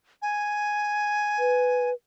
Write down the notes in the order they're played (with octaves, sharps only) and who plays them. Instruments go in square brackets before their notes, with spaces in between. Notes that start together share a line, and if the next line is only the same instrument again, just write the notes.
[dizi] G#5
[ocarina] B4